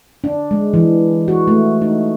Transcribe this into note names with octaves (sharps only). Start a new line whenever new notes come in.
D4
G#3
E3
F#4
A3
D#4